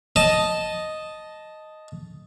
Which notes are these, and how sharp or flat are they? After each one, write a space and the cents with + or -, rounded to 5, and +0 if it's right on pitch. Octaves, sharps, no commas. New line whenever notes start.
D#5 +0 A5 -5